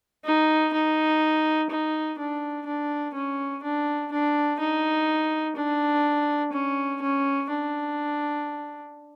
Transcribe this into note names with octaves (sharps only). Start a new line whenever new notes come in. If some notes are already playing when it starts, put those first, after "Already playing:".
D#4
D#4
D#4
D4
D4
C#4
D4
D4
D#4
D4
C#4
C#4
D4